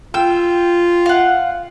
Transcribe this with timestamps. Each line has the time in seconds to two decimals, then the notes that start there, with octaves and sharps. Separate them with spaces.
0.14 F4 G5 E6
1.06 F5 F#5